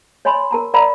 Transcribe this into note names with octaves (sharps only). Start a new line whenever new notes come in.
C#5 D#5 G#5 B5 C6
A#4 A5 A#5
A#4 D5 D#5 F5 A#5 B5